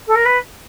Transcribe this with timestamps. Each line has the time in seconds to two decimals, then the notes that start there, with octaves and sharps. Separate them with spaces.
0.07 A4
0.15 A#4
0.25 B4